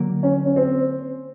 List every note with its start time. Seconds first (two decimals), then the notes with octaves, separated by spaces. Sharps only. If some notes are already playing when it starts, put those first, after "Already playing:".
Already playing: D3 F#3 A#3
0.23 C#4
0.45 C#4
0.56 C4